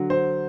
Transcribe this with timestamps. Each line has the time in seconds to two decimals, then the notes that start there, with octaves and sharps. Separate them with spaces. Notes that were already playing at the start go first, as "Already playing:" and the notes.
Already playing: D3 F#3
0.10 C5